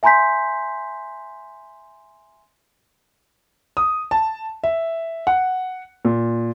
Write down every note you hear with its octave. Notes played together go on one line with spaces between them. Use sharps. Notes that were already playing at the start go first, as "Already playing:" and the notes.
E5 G#5 A#5 C6 G6 B6
D#6
A5
E5
F#5
A#2